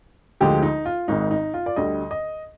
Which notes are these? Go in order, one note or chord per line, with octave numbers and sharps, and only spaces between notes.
D2 D3 F3 G#3 G4
D#4
F4
G#1 G#2 D#3 G#3 D#4
D#4
F4
D5
D2 D3 G3 D#5
D#5